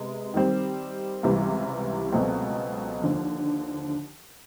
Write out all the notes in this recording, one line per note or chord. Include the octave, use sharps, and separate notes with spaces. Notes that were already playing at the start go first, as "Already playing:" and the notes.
Already playing: C3 G#3 B3
D#3 G3 C4
C#2 C3 E3 G3
C#2 B2 F#3 A3 C4
D#2 D3 F3